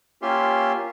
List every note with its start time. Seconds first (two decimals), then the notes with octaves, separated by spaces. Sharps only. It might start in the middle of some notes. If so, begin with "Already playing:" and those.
0.22 A#3 C#4 F4 G4 E5 C6